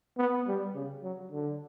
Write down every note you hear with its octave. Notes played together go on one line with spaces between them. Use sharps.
B3
G3
C#3
F#3
D3